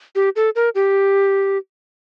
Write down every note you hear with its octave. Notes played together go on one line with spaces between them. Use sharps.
G4
A4
A#4
G4